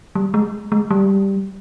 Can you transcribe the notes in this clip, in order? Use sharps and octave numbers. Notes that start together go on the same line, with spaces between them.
G3
G#3
G#3
G3